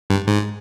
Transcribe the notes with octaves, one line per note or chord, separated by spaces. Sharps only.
G2
G#2